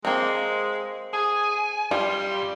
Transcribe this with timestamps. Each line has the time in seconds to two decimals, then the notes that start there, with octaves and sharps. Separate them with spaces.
0.05 G#3 A#3 C4
1.13 G#4 G#5
1.91 F#2 G3 F4 C6